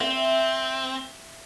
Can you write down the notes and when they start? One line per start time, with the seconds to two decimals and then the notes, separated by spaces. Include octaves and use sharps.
0.01 C4 E5